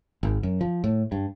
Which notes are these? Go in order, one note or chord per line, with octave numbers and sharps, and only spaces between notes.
G#1
F#2
F3
A2
G2